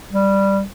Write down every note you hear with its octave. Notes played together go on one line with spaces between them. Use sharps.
G3